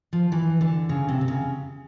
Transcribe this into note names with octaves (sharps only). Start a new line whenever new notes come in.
F3
E3
D3
C#3
C3
C3
C#3